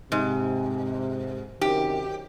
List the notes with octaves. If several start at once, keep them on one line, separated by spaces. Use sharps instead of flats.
G#2 C3
F#2 C3 D#3 G4